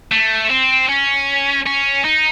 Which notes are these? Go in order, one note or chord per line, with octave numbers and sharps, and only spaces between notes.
A3
C4
C#4
C#4
D#4